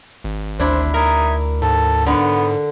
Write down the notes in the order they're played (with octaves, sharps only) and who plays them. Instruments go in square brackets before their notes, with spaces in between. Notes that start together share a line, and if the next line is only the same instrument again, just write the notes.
[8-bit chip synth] G#1
[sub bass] D2 [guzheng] D4 E4 [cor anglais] C5
[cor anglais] D#4 [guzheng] A#4 [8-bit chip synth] E5 G#6
[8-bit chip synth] G#2 [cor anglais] A4
[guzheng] D3 [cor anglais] B3